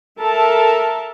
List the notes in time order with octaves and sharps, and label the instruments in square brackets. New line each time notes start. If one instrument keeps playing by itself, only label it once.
[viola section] A4 A#4 E5 A5